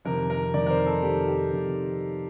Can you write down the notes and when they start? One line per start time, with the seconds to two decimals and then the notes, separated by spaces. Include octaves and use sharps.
0.05 F2 C3 D#3 A#4
0.30 A#4
0.54 F2 C3 D#3 D5
0.66 A#4
0.70 C5
0.86 A4
1.03 F2 C3 D#3 G4
1.28 G4
1.52 F2 C3 D#3